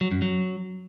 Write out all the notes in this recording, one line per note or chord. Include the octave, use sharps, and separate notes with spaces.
F#3
F#2
F#3